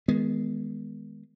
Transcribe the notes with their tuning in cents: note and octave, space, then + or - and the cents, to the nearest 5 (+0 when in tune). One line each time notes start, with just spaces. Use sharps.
D#3 +30 G#3 +0 B3 +0